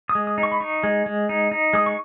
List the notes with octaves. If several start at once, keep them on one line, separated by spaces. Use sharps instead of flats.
D#6
G#3
D#6
D#4
C#6
B5
D#4 C#6
G#3
G#3
D#4
D#4
G#3 D#6
C#6